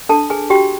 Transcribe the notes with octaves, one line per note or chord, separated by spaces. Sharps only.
D4 A4 A5
G#4 B4 G#5
F#4 G4 G5